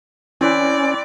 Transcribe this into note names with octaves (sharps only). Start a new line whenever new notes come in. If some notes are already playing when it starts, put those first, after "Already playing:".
E3 C4 C#4 B4 D5